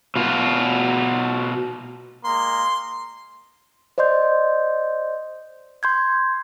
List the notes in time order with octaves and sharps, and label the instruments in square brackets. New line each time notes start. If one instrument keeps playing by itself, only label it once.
[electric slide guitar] B2 F4
[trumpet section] G#3 A#3 A#5 [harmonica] C6
[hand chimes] C5 D5 D#5 C6 G6
C6 G6 G#6